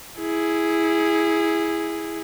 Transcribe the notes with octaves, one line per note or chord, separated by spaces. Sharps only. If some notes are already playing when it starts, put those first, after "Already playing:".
E4 G#4